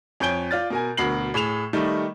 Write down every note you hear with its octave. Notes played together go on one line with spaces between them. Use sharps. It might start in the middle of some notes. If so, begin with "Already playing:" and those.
F2 C#5 G#5 G6 D7 G7
F4 D5 F6 A6
B2 A#4 G#5
D2 B2 A#4 B5 C7 F#7
A2 G#4 E7 F7
D#3 G3 A3 D#4